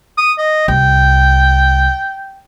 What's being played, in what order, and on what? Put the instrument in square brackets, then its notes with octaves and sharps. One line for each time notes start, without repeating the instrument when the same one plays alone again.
[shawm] D#6
D#5
[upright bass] C2 [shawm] G5